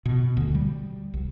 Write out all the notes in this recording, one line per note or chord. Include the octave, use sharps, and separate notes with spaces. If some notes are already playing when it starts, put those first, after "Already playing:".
B2
D2
G3
C2